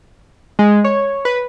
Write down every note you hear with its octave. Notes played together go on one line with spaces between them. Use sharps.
G#3
C#5
B4